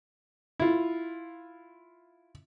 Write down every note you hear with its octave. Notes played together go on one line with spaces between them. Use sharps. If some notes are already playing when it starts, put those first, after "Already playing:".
E4 F4